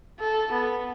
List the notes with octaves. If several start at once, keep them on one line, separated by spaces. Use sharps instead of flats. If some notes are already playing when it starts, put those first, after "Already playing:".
A4
B3